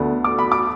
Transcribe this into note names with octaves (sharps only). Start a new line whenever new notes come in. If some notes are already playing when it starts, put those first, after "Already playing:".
Already playing: D2 D3 B3
D6
B5
D6